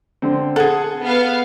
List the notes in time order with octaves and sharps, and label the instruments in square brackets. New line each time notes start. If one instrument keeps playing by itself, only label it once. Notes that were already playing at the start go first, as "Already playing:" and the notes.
[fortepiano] D3 C4
[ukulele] G#4 A4 [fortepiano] F#5
[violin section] B3 F5